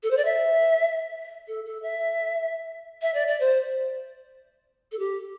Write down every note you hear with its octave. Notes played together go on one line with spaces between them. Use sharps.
A4
C5
D5
E5
A4
A4
E5
E5
D5
D5
C5
A4
G4